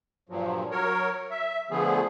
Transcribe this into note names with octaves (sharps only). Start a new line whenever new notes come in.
G2 A#2 F3 F#3
F#3 A#4 C#5
E5
D3 F3 A3 B3 G#4